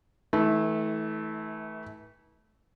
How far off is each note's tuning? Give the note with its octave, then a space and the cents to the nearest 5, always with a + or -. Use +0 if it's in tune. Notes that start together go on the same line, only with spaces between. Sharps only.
E3 -40 A3 -20